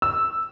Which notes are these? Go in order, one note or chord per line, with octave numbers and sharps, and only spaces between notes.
E6